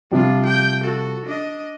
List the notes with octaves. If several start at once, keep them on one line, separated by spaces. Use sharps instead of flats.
C3 F3 G3 D4 F4
G5 G6
F#4 A4
D4 D#5